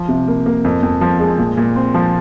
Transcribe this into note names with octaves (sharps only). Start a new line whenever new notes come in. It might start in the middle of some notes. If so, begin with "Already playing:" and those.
Already playing: F3
C3
A#3
A#3
F2
F2
F3
G#3
A#2
A#2
C4
F3